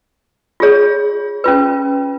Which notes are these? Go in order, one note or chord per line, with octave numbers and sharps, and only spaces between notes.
F4 G#4 C#5
C#4 F4 B4